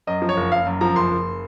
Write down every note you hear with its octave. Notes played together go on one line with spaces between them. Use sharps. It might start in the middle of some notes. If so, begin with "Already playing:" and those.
F#2 D#5
F3
C#5
F#1
F#1 F5
F#2
F3 A#5
F#1 C6
F#1